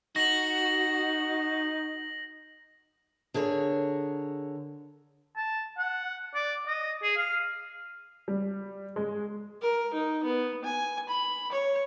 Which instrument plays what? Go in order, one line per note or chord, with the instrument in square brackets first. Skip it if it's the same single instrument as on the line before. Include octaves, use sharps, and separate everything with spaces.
[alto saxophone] D#4 [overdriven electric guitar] F#4 [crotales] A#6 F#7
[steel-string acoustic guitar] D3 G#4 A#4 C#5
[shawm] A5
F#5
D5
D#5
G#4
F5
[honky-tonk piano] G3
G#3
[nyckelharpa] A#4
D#4
B3
G#5
B5
C#5